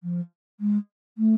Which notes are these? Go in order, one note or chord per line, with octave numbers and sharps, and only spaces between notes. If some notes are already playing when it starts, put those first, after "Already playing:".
F3
G#3
A3